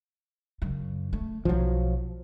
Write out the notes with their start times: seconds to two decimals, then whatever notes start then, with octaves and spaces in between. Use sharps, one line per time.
0.62 F#2 C#3
1.13 A3
1.45 B1 F3 F#3 F4